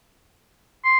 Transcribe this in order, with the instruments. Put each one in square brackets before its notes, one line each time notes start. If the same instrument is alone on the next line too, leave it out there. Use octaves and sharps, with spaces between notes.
[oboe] C6